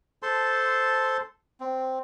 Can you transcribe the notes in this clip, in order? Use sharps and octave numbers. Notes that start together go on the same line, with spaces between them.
A4 C5 A5 C6
C4